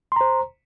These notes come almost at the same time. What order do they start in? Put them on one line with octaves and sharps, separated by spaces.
C6 A#5 C5